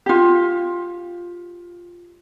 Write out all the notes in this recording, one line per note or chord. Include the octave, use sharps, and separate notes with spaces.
F4 G4